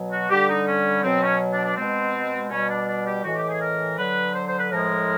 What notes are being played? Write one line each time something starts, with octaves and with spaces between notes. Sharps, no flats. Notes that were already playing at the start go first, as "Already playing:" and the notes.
Already playing: B2 F#3
F#4
D3 G3 G4
D#4
C#4
B2 F#3 C4
C#4
D4
D4
B2 G#3 C4
B2 G3 C#4
D4
D4
G4
A2 E3 G#3 F#4
G4
G#4
A#4
D3 F#3 B4
C5
C5
B4
A2 F3 G#3 A#4